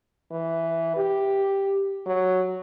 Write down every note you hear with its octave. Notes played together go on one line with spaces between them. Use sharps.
E3
G4
F#3